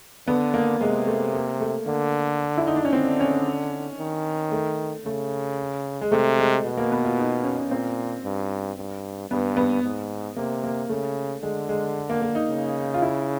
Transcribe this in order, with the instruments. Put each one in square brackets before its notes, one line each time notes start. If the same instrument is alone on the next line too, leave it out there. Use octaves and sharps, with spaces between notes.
[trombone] D3 [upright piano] B3
[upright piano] A#3
[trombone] C3 [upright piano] G#3
[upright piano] A3
A#3
A3
[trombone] D3 [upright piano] A#3
[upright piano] E4
D#4
D4
C#4
[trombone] D3 [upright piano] C4
[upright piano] C#4
[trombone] D#3
[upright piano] A3
[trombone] C#3 [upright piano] A3
[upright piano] G#3
[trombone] C3 [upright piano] A3
[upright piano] G#3
[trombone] B2
[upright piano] A#3
B3
F4
D#4
C#4
C#4
[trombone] A#2 [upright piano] C4
[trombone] G2
G2
[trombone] G2 [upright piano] B3
[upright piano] B3
[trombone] G#2
[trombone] C3 [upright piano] A#3
[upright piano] A#3
[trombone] C#3 [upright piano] A3
[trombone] D3 [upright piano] G#3
[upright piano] G#3
A#3
A#3
D#4
[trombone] C#3
[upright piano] F4
E4